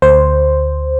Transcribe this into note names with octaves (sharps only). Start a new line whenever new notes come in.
D2 C5